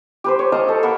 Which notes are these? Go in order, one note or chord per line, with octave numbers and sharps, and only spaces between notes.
G4 B4 C5
C#5
D#5 F5 A5 A#5
A4
A#3 A#4 F#5 B5